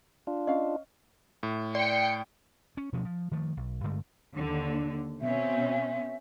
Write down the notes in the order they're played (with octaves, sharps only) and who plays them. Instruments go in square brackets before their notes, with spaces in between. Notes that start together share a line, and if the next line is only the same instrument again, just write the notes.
[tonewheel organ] D4 F4
[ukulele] C#4 F5 [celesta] D#5
[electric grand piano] A2
[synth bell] D5 [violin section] G5 C7 C#7
[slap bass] C#4
B2 F3 F#3 C#4
F3
D#3 F3 A3
B1
G2 D3 G#3 A3
[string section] D#2 D3 [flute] D4
[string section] B2 C4 C#4 [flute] E5